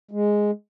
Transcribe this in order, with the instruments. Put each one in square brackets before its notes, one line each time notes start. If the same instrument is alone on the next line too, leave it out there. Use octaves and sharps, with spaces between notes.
[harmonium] G#3